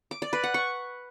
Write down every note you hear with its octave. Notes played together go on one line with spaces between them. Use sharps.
D6
D5
B4
F#5
C#6